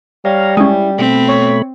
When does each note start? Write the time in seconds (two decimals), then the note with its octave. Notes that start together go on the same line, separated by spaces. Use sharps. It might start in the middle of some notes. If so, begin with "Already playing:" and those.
0.25 G3 C#5 F5 A#5
0.57 G#3 C#4 E4
0.99 B2 A3 C4 B5
1.28 C#5